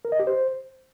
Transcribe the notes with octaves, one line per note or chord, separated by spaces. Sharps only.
A#4
D#5
G4
C5